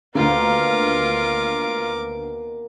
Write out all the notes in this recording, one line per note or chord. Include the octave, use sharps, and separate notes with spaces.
D2 B2 D3 D#3 A#3 F4 A#4 D6